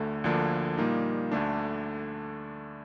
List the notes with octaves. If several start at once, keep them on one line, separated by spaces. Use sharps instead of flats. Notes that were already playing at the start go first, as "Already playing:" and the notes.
Already playing: D2 D3 A3
D2 D3 F3 A#3 D4
A#2 G3 A#3 D#4
D2 D3 A3 D4